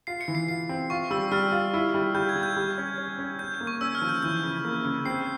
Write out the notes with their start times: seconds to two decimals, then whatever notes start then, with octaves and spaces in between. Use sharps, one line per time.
0.07 F4 C7
0.21 C#7
0.28 E3
0.35 C7
0.48 F4 C7
0.69 C4
0.90 F4 C#6
1.11 G3 E6
1.32 G3 F6
1.52 F4
1.74 E4
1.94 G3
2.14 G3 G6
2.29 G#6
2.36 G3
2.43 G6
2.56 G3
2.78 C#4
2.98 C#4
3.19 C#4
3.39 C#4 G6
3.60 A#3
3.67 C#6
3.81 C#4 E6
3.95 F6
4.02 F3
4.09 G6
4.22 E3 G6
4.43 C#3
4.65 A#3
4.84 C#3
5.06 C4 C7